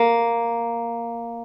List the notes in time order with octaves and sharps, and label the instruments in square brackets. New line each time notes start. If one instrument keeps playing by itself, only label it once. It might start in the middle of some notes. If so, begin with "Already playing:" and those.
Already playing: [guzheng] A#3